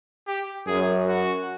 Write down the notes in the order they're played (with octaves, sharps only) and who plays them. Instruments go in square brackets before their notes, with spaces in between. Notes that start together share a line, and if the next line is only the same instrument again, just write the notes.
[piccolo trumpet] G4
[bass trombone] F#2 [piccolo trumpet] G#4
[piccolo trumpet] F#4